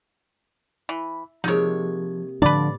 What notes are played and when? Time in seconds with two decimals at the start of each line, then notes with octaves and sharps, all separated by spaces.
0.89 E3 B5
1.44 C3 F3 G#3 A#3 D#4 C#5
2.42 A2 D3 F3 D4 B4 D5